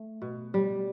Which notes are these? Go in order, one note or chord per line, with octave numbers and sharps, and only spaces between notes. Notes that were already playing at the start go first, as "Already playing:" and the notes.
Already playing: A3
B2
G3